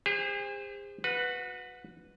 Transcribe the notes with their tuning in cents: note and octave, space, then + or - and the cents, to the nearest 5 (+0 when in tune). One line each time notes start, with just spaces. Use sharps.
G#4 -45 C5 +0
F#4 -25 B4 +0